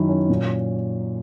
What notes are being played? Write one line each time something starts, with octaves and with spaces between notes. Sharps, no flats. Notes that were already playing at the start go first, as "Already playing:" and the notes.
Already playing: F#2 D#3 E4
C#4
A#2